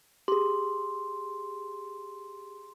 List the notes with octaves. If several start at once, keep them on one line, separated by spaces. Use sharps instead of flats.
G4 G#4 C6